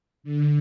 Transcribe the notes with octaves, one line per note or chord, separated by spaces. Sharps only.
D3